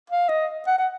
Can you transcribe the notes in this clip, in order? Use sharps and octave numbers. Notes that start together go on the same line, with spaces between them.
F5
D#5
F#5
F#5